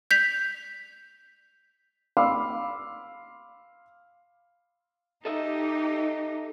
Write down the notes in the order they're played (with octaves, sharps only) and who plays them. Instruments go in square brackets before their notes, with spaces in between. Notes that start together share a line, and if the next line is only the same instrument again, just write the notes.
[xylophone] G6 B6 F7
[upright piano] F5 B5 C6 D6 E6
[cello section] D#4 G4 [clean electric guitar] A4 D#5 E5